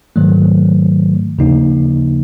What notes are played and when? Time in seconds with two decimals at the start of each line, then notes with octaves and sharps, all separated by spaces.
0.16 G#2 D#3 F#3 A3
1.38 D#2 C#3 F3 A#3 D#4